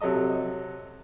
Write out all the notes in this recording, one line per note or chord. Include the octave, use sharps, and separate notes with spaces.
C3 F#3 A4 D#5 D#6